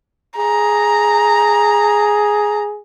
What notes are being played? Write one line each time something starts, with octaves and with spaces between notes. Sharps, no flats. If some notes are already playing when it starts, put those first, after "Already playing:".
G#4 A#5